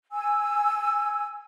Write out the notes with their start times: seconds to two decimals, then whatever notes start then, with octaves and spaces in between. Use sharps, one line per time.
0.12 G#5 E6